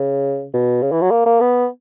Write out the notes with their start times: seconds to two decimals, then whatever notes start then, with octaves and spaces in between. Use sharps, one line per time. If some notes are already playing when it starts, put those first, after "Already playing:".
Already playing: C#3
0.53 B2
0.83 C#3
0.92 E3
1.02 F#3
1.11 A#3
1.26 A#3
1.41 B3